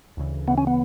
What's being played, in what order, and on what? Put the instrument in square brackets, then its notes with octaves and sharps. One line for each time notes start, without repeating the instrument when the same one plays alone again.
[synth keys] D2 C#3 E3
[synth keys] D2 C#3 E3 [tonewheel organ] B3
[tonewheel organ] C#4
B3